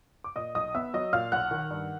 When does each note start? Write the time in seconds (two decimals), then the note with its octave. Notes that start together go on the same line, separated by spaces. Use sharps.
0.24 D6
0.36 A#2 D#5 D#6
0.55 B1 D#5 D#6
0.75 B3 E5 E6
0.94 F#3 D#5 D#6
1.13 A#2 F5 F6
1.32 B1 F#5 F#6
1.51 D#3
1.70 G2